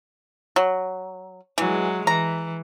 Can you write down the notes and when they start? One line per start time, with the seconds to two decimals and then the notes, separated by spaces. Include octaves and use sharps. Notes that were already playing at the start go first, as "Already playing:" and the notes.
0.56 F#3
1.58 E3 F#3 G#3
2.07 E3 A#5